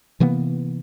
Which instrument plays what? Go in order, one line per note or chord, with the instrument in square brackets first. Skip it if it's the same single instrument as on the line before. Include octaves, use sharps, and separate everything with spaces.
[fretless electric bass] C3 E3 A#3 B3